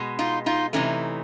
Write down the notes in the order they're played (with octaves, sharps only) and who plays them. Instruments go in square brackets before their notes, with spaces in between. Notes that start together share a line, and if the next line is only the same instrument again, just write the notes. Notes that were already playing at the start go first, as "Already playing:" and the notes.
Already playing: [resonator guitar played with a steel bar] B2 G#3
D#4 F4
D#4 F4
C3 E3 A3 C#4 D#4